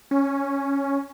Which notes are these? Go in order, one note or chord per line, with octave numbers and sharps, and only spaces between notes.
C#4